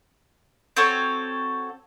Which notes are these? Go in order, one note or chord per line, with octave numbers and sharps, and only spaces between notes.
C4 F#4 A4 C#5